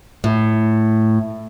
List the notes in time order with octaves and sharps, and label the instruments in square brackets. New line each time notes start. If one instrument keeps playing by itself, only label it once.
[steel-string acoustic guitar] A2